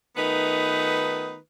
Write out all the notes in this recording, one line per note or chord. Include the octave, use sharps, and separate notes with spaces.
D#3 A3 B3 D#4 F4 B4